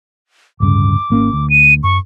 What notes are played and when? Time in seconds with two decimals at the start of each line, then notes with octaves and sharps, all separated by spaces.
0.60 D1 G2 C#3 D6
1.10 G#1 A#3 C#4
1.33 D2
1.50 D#7
1.83 F#2 C#6